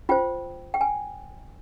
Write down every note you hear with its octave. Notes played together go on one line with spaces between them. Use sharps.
F4 C5 G5
G5
G#5